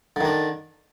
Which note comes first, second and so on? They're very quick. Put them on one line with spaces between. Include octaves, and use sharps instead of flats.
D3 D#3 D4